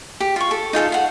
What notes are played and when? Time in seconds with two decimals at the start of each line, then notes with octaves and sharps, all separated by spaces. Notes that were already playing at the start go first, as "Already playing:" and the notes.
0.20 G4
0.36 F4 C#6
0.51 A4
0.73 D#4 F4 G#4 A4
0.92 F5 F#5